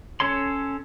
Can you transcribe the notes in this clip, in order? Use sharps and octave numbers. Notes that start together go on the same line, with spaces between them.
C#4 A4 C#5 C6